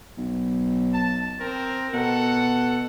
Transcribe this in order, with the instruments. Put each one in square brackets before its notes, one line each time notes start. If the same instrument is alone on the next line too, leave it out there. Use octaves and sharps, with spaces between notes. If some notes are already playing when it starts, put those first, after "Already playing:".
[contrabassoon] B1
[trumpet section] A5
C4 A#4
[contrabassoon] B2 [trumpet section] A4 F#5